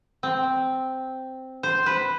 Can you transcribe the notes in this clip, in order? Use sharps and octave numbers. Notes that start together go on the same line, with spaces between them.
C4
C5
B4